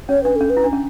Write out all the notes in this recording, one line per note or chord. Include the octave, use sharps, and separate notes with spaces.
C#4 C#5
D4 B4
C#4 A4
B4
E4
D4
C#4